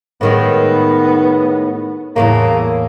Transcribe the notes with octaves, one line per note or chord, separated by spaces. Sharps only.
A2 D#3 G#3 B3
E2 A2 C#3 A#3